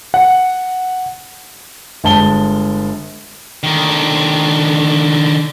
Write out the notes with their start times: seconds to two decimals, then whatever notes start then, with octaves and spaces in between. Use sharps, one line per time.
0.14 F#5
2.04 G1 G#3 A5 G7
3.63 D3 D#3